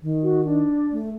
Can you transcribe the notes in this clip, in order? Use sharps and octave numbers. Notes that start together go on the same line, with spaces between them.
D#3
F#4
D4
A3